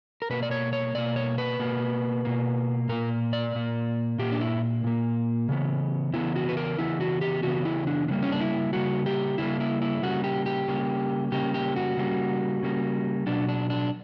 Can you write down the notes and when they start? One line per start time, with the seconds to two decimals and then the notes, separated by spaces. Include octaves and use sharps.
0.22 A#4
0.30 B2 A#3 B4
0.43 D5
0.51 C#5
0.73 C#5
0.95 B2 A#3 D5
1.16 C#5
1.38 B4
1.59 B2 A#3
2.25 B2 A#3
2.89 A#2 A#3 A#4
3.33 D5
3.55 A#2 A#3
4.19 A#2 A#3 G4
4.32 D4
4.41 E4
4.84 A#2 A#3
5.49 C#3 E3 B3
6.13 C#3 E3 B3 E4
6.36 F#4
6.49 B4
6.57 A#4
6.78 C#3 E3 B3 E4
7.00 F#4
7.21 G4
7.43 C#3 E3 B3 F#4
7.65 E4
7.87 D4
8.08 C#3 G3 A#3 D4
8.23 C#4
8.32 D4
8.41 E4
8.73 C#3 G3 A#3 F#4
9.06 G4
9.38 C#3 G3 A#3 E4
9.60 E4
9.82 E4
10.02 C#3 G3 A#3 F#4
10.24 G4
10.46 G4
10.68 C#3 G3 A#3
11.32 C#3 G3 A#3 G4
11.54 G4
11.76 F#4
11.97 C#3 G3 A#3
12.63 C#3 G3 A#3
13.26 B2 F#3 B3 D4
13.49 D4
13.70 D4